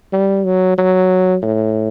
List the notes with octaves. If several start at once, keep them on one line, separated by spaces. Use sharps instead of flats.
G3
F#3
F#3
A2